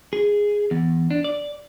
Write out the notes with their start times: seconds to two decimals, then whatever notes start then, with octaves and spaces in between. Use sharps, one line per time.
0.13 G#4
0.71 E2
1.11 D4
1.24 D5